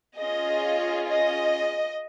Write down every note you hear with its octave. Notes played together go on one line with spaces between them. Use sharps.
C#4 F4 G#4 D#5
D#5